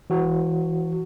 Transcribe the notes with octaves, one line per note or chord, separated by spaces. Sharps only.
E3 F#4